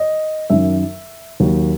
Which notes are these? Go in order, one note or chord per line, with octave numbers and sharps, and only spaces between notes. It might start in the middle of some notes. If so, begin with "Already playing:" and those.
Already playing: D#5
F#2 D#3 F#3 E5
D#2 D#3 F#3